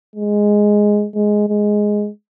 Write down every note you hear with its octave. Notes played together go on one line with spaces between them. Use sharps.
G#3
G#3
G#3